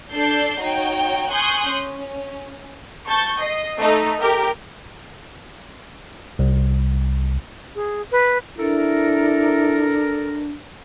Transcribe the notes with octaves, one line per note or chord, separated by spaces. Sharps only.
D4 A4 D5 G6 C7
D#4 F#4 C#5 G5
G#5 C6 C#6 D#6 F#6 G6
C#4
A5 C#6 G6 A6
D#5 C7
A3 D#4 A4
G4 A#4
C2
G#4
B4
D4 E4 A4 A#4